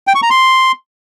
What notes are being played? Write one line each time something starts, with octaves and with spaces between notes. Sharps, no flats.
G5
C#6
A#5
C6